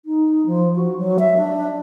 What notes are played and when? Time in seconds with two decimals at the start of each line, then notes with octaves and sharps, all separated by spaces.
0.05 D#4
0.46 F3
0.76 F#4
0.98 F#3
1.19 E5
1.37 D4